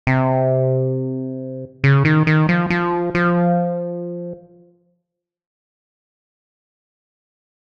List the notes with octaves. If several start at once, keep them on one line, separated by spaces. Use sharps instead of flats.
C3
C#3
D#3
D#3
F3
F3
F3